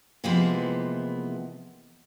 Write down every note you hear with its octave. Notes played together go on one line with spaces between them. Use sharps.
C3 E3 F3 G#3 A#3 B3